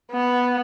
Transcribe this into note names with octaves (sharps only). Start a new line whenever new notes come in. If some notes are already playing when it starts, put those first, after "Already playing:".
B3